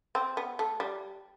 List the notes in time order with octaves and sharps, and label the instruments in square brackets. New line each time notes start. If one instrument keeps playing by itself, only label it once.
[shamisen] C4
B3
A3
G3